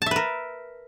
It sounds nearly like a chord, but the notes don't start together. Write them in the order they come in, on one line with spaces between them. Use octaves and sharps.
A5 E5 B4 A#4